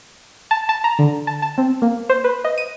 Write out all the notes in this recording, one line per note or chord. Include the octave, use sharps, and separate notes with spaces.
A5
A5
A#5
D3
A5
A5
C4
A#3
C5
B4
D#5
D#7